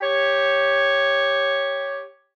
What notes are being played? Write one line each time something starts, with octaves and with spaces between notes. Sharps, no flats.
G4 C#5